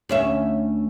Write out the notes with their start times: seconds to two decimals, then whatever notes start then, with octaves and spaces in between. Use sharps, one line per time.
0.09 D2 C#4 E5